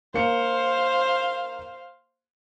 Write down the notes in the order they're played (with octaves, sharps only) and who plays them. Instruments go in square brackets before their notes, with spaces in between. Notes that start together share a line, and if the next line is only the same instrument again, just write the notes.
[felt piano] A#3 C#7 [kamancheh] C5 F5